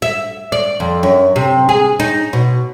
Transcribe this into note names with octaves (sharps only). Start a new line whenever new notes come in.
E5
D5
F2
F#2
C3
G#4
D#4
B2